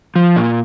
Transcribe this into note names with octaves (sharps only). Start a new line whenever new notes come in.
F3
A#2